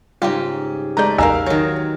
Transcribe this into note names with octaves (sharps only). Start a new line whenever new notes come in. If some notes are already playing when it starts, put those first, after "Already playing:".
G#2 C#3 G3 F4 G4
G#3 A3 B4 D5 A#5 G6
A#1 E2 D#4 A#4 F5 G#5 A#5 E6
D#3 F#3 C#5